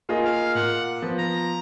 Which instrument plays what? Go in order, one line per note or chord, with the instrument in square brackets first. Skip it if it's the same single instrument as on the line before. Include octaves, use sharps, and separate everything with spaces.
[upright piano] A#3 F4 G#4 D#5
[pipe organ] F5
[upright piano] A#2 [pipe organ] F#5
[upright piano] F3 B3
[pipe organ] A#5